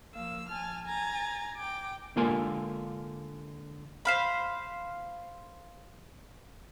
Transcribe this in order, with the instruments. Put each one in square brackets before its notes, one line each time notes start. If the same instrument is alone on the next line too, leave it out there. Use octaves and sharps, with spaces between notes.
[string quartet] F3 A#3 F5 E6
G#5 A5 F6
G#5 A#5 A6
G5 D6
[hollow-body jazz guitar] D3 G#3 A#3 F4 A#4 G#5
[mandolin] C5 F5 B5